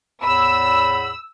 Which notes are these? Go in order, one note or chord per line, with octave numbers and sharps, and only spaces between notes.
E2 A2 B5 E6